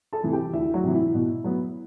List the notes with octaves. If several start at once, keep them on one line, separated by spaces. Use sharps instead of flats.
A4 A5
C3 E3
G4 G5
D2 E4 E5
F#3 F#4
C3 E3
E4
B2
F#3 B3